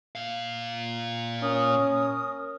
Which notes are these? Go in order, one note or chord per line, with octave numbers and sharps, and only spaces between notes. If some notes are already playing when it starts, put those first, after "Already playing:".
A#2 F5
C#4 A#4 D#6